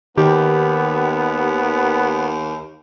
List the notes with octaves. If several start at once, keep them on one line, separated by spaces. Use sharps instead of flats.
D#2 D#3 B3 G4